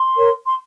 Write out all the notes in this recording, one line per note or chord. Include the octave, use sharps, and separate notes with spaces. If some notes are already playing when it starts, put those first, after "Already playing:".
Already playing: C6
A#4 C#5
C6